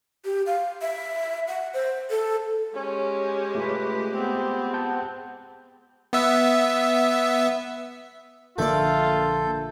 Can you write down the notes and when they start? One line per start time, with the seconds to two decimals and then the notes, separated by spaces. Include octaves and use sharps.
0.25 G4
0.46 F5
0.82 E5
1.48 F#5
1.74 C5
2.10 A4
2.74 G#3 C#4 G4
3.55 A3 F4 B4
4.13 B3 C4
4.73 F#5 A5 G6
6.13 B3 E5
8.58 A#1 D3 A3 A#3 F4 A4 D5 G6